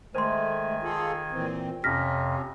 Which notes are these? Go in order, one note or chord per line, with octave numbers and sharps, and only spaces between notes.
D#3 G#3 A3 C5 G#5 C6
F4 G#4 A4
A#2 E3 C4
F2 C3 C#4 F6 A#6 B6